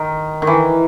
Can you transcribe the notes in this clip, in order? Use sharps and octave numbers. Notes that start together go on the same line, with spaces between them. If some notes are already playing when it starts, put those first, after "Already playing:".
Already playing: D#3
D#3
E3